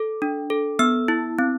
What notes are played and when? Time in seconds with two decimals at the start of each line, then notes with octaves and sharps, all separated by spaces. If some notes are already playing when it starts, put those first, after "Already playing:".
Already playing: A4
0.22 D4
0.50 A4
0.79 B3 E6
1.08 E4
1.39 C4